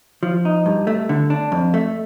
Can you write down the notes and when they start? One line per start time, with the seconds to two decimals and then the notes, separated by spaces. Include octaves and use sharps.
0.23 F3
0.45 D#4
0.66 G2
0.87 A3
1.09 D3
1.30 D4
1.52 F2
1.74 A3